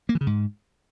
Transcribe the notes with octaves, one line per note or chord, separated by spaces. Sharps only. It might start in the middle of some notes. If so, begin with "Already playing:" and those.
A#3
E3
C#3
G#2